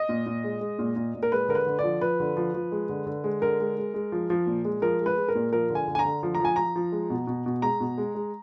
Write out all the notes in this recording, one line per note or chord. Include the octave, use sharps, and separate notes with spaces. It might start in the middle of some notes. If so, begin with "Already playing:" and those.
Already playing: D#5
A#2
A#2
G#3
G#3
A#2
A#2
A#2
A#4
G#3 B4
D3 A#4
B4
D3
F3 D5
F3 B4
D3
F3
F3
G#3
D3
D3
G#3
D3 A#4
G#3
G#3
G#3
F3
F3
A#2
G#3
F3 A#4
G#3
B4
G#3
A#4
A#2
F3 A#4
D3
G#5
D3
G#5
A#5
D3
F3
A#5
F3 G#5
F3 A#5
F3
G#3
B2
B2
B2
G#3 A#5
B2
G#3
G#3